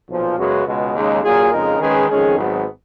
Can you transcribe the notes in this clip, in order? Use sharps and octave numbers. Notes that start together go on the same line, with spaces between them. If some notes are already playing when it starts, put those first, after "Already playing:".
B1 A#2 F3
F#2 C#3 G#3 B3 F#4
C#2 B2 G#3
D#2 C#3 G#3 D#4
A#2 F#3 A#3 F4 G#4
F2 C#3 G#3 D#4 A#4
D#3 G#3 C#4 G#4 B4
F2 D#3 G#3 C#4 G#4
G#1 G#2 F#3 B3